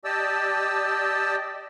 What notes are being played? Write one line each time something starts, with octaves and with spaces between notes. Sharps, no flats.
G4 D5 D#5 A5 E6